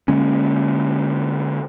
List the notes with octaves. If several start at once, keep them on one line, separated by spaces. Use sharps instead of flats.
D3 G#3 A#3 C#4